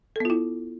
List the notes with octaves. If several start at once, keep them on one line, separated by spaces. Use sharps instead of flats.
B3 E4 F4 A4